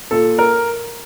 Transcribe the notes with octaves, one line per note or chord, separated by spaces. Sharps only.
A#2 A4
A#4